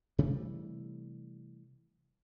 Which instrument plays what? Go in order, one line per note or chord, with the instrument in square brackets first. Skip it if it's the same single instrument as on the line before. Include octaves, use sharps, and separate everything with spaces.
[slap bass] C3 E3 G3 A3